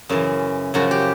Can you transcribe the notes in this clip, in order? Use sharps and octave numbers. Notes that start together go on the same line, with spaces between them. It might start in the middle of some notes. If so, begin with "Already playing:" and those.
F#2 C#3 E3
F#2 C#3 F3 F#4
G4